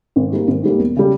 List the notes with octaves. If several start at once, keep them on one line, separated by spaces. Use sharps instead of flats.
G#1
G#2 G3 A#3
G#1
G#2 G3 A#3
E1
C#3 G3